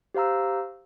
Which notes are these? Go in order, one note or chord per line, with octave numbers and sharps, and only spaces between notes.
G4 C5 F5 A#5 E6